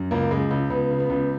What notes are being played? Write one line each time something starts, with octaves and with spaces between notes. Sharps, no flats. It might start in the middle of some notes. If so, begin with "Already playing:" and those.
Already playing: F#2
C#2 A#3
C#2 G#3
C#2
C#2 B3
C#3
B3
C#2